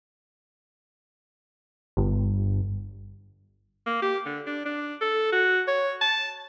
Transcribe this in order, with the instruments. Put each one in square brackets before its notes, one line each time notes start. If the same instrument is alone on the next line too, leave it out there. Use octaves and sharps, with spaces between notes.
[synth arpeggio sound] G1
[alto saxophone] A#3
G4
D3
D4
D4
A4
F#4
C#5
A5